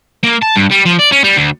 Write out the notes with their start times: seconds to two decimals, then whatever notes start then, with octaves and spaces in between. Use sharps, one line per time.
0.24 A#3
0.43 A5
0.57 G2
0.72 G3
0.86 F3
0.99 D5
1.12 C#4
1.24 G3
1.37 D2